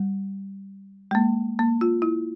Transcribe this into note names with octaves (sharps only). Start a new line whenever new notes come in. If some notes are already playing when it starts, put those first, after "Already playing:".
Already playing: G3
G#3
A#3
A#3
F4
E4